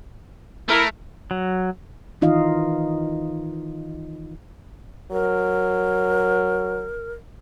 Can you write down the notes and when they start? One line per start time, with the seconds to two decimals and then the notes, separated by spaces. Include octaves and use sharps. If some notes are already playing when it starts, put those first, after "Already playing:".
0.69 A3 E4 A#4
1.31 F#3
2.21 D#3 E3 D#4 F4 D#5 F5
5.12 F#3 A#4